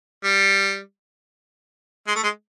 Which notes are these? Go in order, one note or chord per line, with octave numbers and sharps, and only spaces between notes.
G3
G#3
A3
G#3